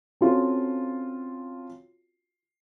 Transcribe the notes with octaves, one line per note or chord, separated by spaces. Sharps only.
C4 C#4 F4 F#4 A4